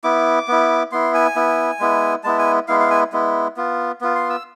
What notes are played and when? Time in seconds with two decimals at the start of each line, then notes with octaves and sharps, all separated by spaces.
0.04 B3 E4 D6
0.48 B3 E4
0.92 B3 E4 C6
1.14 G#5
1.36 B3 E4
1.80 G#3 B3 E4
2.24 G#3 B3 E4 A5
2.39 G#5
2.68 G#3 B3 E4 F5
2.80 F5
2.90 G#5
3.13 G#3 B3 E4
3.57 B3 F4
4.01 B3 F4
4.15 C6
4.30 E6